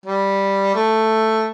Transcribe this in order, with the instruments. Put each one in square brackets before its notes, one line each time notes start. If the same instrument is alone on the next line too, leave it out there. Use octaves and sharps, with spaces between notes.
[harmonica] G3
A3